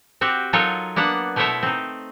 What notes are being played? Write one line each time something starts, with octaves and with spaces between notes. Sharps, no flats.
C4 F#4 G4
F#3 D#4 F4 A4 A#4 C#5
A#3 B3 D4 F#5 A5
B2 A3 E4 C5 C#5 E5
C4 D#4